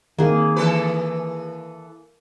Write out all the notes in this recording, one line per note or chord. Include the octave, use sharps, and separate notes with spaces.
D#3 A#3 C4 G#4
E3 A4 B4